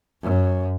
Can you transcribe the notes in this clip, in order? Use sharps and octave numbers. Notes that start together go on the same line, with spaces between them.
F#2